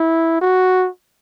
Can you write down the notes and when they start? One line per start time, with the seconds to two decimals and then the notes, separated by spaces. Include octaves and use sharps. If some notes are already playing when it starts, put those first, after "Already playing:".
Already playing: E4
0.41 F#4